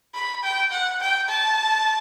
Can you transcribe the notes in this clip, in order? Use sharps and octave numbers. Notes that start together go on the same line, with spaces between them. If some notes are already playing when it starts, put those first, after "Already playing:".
B5
G5
F#5
G5
A5